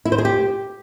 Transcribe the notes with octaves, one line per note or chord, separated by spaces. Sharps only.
E4
C5
G#4
G4